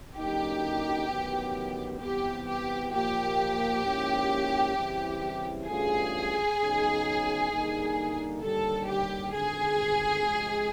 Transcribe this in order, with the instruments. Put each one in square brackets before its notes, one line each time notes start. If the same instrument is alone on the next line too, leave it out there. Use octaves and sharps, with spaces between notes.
[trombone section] F#2 D3 F#3 A#3 D#4 [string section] G4
[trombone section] A1 G2 D#3 F#3 B3
[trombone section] C3 E3 G3 B3 [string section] G4
[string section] G4
[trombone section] A#2 F3 A#3 [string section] G4
[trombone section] G#2 F3 A#3 C#4 E4
C#3 E3 G3 C4 E4
[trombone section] G2 E3 A3 C#4 F4 [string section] G#4
[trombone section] C#3 F#3 B3 D#4
D3 G3 A#3 D#4
[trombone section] D#2 D3 G3 [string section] A4
[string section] G4
[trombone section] G#1 G2 D3 [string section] G#4
[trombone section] D2 C3 F3 G#3